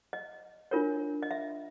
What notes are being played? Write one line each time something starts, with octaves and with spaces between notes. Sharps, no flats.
D#5
D4 F4 A#4 C#5
D#5
E5